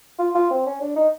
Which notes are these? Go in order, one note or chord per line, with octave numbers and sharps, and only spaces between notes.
F4
F4
C4
C#4
D4
D#4